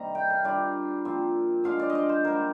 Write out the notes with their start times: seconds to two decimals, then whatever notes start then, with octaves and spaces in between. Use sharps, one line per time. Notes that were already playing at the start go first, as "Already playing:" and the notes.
Already playing: C3 D#3 G3 A#3 A#5
0.15 G5
0.30 F5
0.44 G3 D4 F4 D5
1.05 A#2 F3 C4
1.64 D3 G#3 D4 F4 F5
1.79 D5
1.90 D#5
1.95 D5
2.09 C5
2.24 D3 G3 A#3 A#4